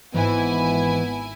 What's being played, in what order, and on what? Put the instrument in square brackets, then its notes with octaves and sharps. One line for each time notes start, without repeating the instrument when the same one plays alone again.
[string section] G#1 E4 G#5 [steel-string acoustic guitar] G#2 [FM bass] E3 [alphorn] B3